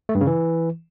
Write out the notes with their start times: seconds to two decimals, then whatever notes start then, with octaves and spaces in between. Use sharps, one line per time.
0.09 A3
0.15 G2
0.21 C#3
0.27 E3